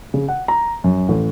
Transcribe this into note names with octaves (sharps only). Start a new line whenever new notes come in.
C#3
F#5
A#5
F#2
A1